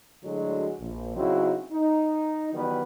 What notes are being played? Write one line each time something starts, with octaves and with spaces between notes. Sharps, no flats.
A2 D3 F#3 G#3 D4 F#4
A#1
C#3 F#3 C4 D#4 E4 F#4
D#4
D#3 E3 F#3 G3 B3 B4